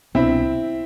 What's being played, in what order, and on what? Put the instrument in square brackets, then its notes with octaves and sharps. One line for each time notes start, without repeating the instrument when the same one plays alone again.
[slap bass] C2 B2 B3 D4 [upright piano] C4 E4